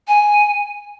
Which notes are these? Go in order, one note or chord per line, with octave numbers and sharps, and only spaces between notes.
G#5